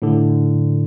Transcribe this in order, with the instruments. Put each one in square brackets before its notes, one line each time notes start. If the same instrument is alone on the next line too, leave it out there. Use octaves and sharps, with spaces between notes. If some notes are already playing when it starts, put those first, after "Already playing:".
[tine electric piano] A2 D3